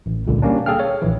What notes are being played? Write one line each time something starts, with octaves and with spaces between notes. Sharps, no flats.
A1
C#2 A#2 D3
G3 A#3 C#4 D4
G#4 A4 F5 G5 F6
C#5
A#1 E3